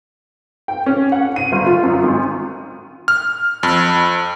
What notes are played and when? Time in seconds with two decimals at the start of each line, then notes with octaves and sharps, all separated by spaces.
0.68 G5
0.86 C#4
1.12 F#5
1.36 D#7
1.52 G1
1.66 F4
1.83 F#2
2.03 G#1
3.08 F6
3.63 F2